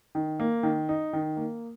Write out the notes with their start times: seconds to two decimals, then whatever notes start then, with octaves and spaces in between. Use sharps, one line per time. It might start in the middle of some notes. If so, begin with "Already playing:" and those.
0.15 D#3
0.40 A#3
0.63 D#3
0.89 D#4
1.13 D#3
1.37 A#3